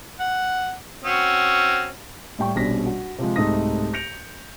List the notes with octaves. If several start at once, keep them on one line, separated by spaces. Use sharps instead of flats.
F#5
C4 C#4 F#4
A2 G3 G5 C#6
A#1 B2 G3 C#4 A#6 B6
F#4
C3 F3 G#3
C2 G#2 A3 D#4 D#6 A#6
G6 A#6 C#7 D7 F7